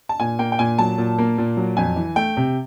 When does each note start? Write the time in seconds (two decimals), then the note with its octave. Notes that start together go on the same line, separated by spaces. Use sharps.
0.09 A5
0.20 A#2 G#5
0.39 A#3 G5
0.52 G5
0.59 A#2 G#5
0.79 F#3 A5
0.98 A#2
1.19 A#3
1.38 A#2
1.57 F#3
1.77 F2 G#5
1.96 E3
2.16 A3 G5
2.37 C3